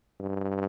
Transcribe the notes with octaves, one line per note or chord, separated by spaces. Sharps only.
G2